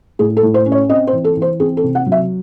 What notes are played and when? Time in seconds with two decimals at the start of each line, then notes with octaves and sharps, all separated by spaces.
0.19 A2 G#4
0.37 A4
0.43 A2
0.54 C5
0.66 C#4
0.72 C#5
0.89 C4 D#5
1.07 C5
1.13 E3
1.24 A4
1.36 E3
1.42 C5
1.60 C4 G#4
1.77 A4
1.83 C3
1.95 F#5
2.06 F#3
2.12 E5